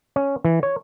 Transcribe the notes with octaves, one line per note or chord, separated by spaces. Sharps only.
C#4
E3
C#5